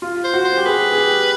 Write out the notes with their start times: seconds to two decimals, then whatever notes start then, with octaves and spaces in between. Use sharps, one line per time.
0.02 F4
0.24 C5
0.34 F#4
0.44 C5
0.57 G4
0.66 G#4 B4
0.92 G#4
0.98 G4